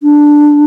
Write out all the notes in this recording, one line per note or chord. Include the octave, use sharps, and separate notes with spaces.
D4